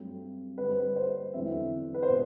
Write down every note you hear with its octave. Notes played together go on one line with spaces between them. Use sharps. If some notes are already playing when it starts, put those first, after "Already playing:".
Already playing: G2 F#3 A3 C4
G2 D3 G3 B4
C5
B4
C5
E2 D3 F#3 C4 E5
B4
C5
B2